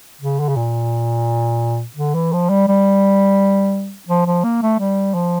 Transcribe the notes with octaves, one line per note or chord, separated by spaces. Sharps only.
C#3
D3
C#3
A#2
D3
E3
F3
G3
G3
F3
F3
A#3
A3
G3
F3